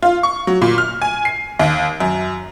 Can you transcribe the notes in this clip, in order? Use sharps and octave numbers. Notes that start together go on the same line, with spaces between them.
F4
C#6
F#3
A#2
F6
G#5
C7
D#2
F#2